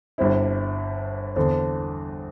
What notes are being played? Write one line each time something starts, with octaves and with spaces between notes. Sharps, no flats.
G1 G2 G3 C4 E4
E2 D3 C4